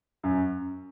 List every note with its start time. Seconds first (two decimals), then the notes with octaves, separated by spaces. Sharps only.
0.23 F#2